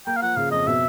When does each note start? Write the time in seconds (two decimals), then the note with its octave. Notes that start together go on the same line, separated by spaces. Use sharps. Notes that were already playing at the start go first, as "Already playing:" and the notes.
0.07 A#3 G5
0.16 F5
0.22 F3 F#5
0.37 C#3 F5
0.51 F2 D#5
0.67 B2 E5